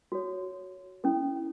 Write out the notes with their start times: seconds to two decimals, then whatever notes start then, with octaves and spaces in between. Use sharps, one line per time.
0.12 F#4 A4 C#5
1.04 C#4 E4 A4